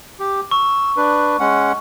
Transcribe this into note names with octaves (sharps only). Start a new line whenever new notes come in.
G4
C#6 E6
D4 B4
G#3 C#4 F#5